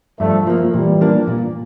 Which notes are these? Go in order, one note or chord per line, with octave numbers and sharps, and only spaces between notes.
G2 F3 A3
F3 A#3
A#2 E3 G3
F3 A#3 D4
A#2